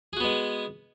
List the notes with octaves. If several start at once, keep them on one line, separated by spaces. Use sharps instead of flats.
G#3 B3 F#4 G#4